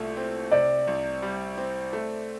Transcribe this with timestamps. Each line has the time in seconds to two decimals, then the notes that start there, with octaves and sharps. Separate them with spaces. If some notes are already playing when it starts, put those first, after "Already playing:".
Already playing: C2 A#2 A3
0.17 C4
0.52 C3 D5
0.87 C2
1.22 G3
1.57 C4
1.93 A3